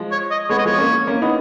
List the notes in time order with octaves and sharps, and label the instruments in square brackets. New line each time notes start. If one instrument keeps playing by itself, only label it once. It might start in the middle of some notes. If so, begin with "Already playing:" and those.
Already playing: [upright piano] F3 G#3
[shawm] C#5
D#5
[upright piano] G#3 B3 [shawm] C#5
[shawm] D#5
[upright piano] F3 G#3 [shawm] C#5
[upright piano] A#3 C#4
A#3 C#4
B3 D#4